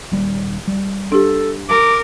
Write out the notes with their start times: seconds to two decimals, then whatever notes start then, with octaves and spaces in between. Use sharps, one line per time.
0.12 D#1 D#2 G3
0.68 G3
1.12 D4 G4 A4
1.69 A#4 D6